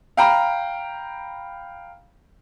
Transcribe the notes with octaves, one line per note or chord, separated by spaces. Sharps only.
F5 G5 A#5 B5